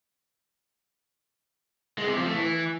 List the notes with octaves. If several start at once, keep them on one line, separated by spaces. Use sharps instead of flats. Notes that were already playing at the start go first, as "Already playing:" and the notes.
G#3
C3
F3
A3
E3